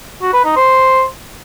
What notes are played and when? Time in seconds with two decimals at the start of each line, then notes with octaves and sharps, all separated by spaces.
0.22 F#4
0.33 B4
0.45 D#4
0.56 C5